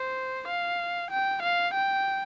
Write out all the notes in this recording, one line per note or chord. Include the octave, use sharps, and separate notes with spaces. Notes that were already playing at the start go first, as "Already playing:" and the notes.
Already playing: C5
F5
G5
F5
G5